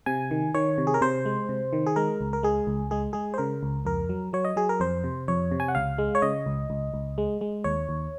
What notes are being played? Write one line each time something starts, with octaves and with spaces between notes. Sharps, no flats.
C3 G#5
D#3
D#3 C#5
C3
G#4
A#4
C3 C5
G#3
C3
D#3
G#4
G#3 A#4
C#2
A#4
G#3 G#4
C#2
G#3 G#4
G#3 G#4
C5
C#3 A#4
C#2
F2 A#4
F#3
F#3 C#5
D#5
F#3 G#4
A#4
F2 C5
C3
F2 C#5
C3
G#5
F#5
C#2 F5
G#3
C#5
C#3 D#5
C#2
C#2
C#2
G#3
G#3
D#2 C#5
D#2